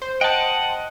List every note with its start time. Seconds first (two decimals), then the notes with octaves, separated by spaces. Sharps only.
0.02 C5
0.21 D#5 F#5 G5 A5